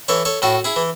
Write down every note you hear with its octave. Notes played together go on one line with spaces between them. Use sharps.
E3 A4 C#5
A4 C#5
A2 F#4 A4
E4 G#4
E3